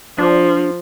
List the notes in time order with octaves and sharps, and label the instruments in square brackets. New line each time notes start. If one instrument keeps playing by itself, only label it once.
[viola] F3 [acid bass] D4